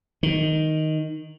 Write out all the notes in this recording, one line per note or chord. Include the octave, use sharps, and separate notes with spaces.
D#3